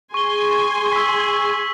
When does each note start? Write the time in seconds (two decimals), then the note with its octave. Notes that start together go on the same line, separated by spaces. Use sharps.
0.14 G#4 G#5 C6 C#6 G7
0.93 E6 B6